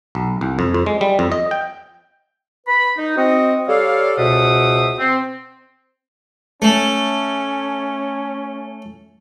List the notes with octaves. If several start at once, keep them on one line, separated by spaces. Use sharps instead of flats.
B1
C2
F2
F2
G#3
G3
F2
D#5
G5
B4 B5
D#4
C4 F#4 D#5
G3 A4 C#5 D5 F5
C#2 B2 C5 E5 F#5 D#6
C4
A3 C#4